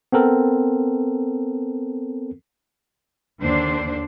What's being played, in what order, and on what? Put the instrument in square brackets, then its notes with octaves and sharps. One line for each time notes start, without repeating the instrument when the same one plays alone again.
[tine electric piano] B3 C4 A4 A#4
[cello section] D#2 D3 D4 C5